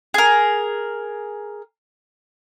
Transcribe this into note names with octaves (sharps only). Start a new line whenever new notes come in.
G#4 A#4